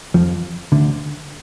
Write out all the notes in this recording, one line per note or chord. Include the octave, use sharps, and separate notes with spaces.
F2 F3
D2 D3